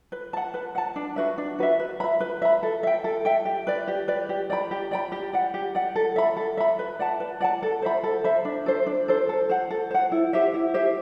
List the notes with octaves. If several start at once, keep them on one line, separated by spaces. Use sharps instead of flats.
B4
F#5 A5
B4
F#5 A5
D4
F#4 B4 E5
D4
F#4 B4 E5
B4
E5 B5
B4
E5 B5
A4
E5 G5
A4
E5 G5
G4
B4 D5
G4
B4 D5
G4
D5 G5 B5
G4
D5 G5 B5
G4
D5 F#5
G4
D5 F#5
A4
E5 B5
A4
E5 B5
B4
D5 F#5 A5
B4
D5 F#5 A5
A4
C5 E5 B5
A4
C5 E5 B5
D4
A4 C5
D4
A4 C5
A4
C5 F#5
A4
C5 F#5
E4
G4 C5 E5
E4
G4 C5 E5